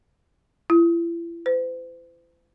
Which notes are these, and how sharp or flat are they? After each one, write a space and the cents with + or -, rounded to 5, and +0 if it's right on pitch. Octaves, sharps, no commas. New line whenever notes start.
E4 +40
C5 -45